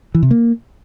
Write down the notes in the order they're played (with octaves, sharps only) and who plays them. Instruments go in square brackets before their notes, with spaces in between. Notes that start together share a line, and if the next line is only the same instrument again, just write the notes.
[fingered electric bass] E3
C3
A#3